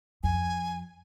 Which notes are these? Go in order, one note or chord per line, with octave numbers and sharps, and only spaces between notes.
F2 G#5